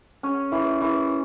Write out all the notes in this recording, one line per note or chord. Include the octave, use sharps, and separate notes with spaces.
C#4
E3
E3